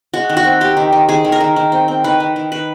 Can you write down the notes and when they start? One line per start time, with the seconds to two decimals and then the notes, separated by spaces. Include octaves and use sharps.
0.14 G#3 F#4
0.29 D#3
0.37 F#4
0.44 C4
0.61 C4 G4
0.77 D#3
0.93 D#3
1.09 D#3 G#4
1.24 D#3
1.32 A#4
1.40 D#3
1.56 D#3
1.72 C4
1.88 C4
2.04 D#3 B4
2.20 D#3
2.36 D#3
2.52 D#3 B4